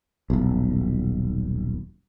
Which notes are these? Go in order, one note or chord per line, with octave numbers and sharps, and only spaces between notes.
D#1 B1